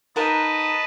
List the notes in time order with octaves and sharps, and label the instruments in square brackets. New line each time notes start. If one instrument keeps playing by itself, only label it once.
[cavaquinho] D#4 A#4 F#5 [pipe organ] B4 D#5 A5